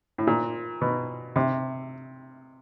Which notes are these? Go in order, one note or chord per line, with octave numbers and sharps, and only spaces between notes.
A2
A#2
B2
C3